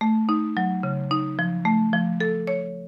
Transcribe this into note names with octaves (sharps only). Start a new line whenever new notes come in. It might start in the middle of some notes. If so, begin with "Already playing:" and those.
A3
D#4
F#3
C#3
D#4
F3
A3
F3
A4
C#5